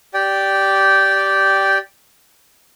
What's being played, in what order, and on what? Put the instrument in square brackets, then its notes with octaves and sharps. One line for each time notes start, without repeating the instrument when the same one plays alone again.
[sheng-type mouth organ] G4 D5 G5